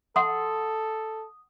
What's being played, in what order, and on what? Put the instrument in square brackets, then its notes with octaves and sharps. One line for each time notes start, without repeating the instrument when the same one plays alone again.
[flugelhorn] A4 [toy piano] F#5 C6 [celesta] D#6